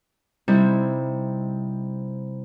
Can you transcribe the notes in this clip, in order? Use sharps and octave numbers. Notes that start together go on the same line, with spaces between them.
C3 G3 D#4 E4